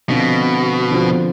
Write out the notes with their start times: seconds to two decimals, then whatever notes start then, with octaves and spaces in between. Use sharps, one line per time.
0.09 B2 D3 F3 C4 F4
0.91 D3 F3 C4 F4